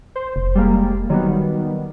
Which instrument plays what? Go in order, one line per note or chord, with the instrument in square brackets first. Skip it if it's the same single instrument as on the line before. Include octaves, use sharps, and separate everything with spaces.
[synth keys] C5
[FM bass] F1
[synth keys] G3 G#3 A#3
[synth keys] D#3 G3 B3 [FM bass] F#3